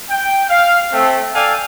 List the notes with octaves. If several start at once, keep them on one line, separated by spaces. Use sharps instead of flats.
G5
F5
A3 C4
A4 D5 F5 G5 G#5